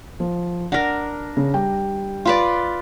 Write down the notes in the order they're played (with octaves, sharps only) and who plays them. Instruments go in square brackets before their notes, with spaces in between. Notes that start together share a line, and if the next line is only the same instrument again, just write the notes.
[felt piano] F3
[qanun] D4 A#4 [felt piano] F#5 A#6
[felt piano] C#3
G3 G5
[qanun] F4 B4 D5